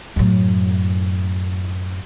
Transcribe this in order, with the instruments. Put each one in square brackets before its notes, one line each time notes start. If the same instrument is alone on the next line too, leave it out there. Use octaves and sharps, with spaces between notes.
[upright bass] F#2 A2